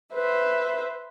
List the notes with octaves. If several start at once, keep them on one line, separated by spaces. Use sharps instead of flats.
B4 C5 E5